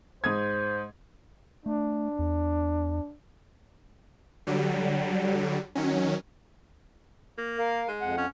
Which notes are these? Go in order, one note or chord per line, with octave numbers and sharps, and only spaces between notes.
G#2 C5 D#6 G#6
A3 D4
E2
D3 F#3 G3
D#3 F#3 C#4
A#3
A#4 F5
G#3
F2 F#5
C#4